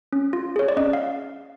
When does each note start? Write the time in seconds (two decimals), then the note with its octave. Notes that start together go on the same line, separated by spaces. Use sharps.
0.13 C#4
0.33 F4
0.56 G#4 C#5
0.68 D5
0.77 C#4 D#5
0.93 F5